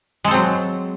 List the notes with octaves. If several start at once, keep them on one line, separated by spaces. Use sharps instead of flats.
F#3 G#3 C4 A4